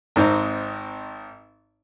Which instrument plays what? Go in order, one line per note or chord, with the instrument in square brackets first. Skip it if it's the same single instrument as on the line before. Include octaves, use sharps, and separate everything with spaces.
[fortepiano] G#1 G#2 C4 D#4 A#5